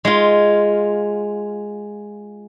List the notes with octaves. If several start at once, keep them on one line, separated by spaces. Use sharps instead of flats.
G#3 F4